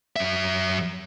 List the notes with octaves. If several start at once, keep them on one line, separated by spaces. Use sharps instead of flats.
F#2 E5